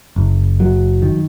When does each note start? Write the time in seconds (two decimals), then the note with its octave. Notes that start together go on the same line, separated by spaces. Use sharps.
0.16 F#1
0.60 F#3
1.02 D#3